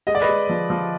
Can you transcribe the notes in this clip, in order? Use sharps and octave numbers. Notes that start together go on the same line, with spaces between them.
G#3 D#5
D5
B4 D#5
G#3
F3
F3